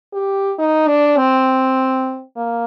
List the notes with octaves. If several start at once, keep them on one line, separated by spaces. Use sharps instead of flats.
G4
D#4
D4
C4
A#3